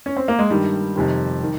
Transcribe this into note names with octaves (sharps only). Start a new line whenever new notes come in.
C#4
C4
A#3
G#3
G2 D#3 G3
F2 C3 D#3
D#3